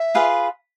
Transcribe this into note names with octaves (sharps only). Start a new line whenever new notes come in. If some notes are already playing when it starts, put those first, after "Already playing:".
Already playing: E5
F4 G#4 B4 F5